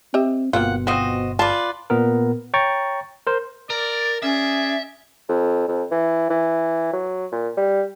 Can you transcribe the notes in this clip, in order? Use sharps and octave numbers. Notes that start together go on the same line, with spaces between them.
C4 G4 D#5 E5
G1 B2 A#3 C4 F4 F#5
F3 C4 F#4 C5 D#5
F4 B4 D5 A5
A#2 B3 A#4
C#5 G5 A#5 C#6 A6
A#4 C5
A#4 D5
C#4 G#4 D5 E5
F2
F2
E3
E3
F#3
A#2
G3